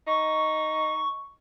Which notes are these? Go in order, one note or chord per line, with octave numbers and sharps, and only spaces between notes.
D#4 C#6